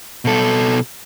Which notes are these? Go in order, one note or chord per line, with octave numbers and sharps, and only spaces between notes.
B2 A4